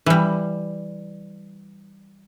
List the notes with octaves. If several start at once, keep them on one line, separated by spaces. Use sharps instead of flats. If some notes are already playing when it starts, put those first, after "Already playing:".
E3 G3